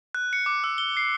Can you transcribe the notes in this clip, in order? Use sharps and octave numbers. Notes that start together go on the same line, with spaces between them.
F#6
C#7
D6
E6
G7
C7